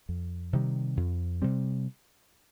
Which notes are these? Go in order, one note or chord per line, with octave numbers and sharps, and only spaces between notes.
F2
C3 D#3 G3
F2
C3 G3 C4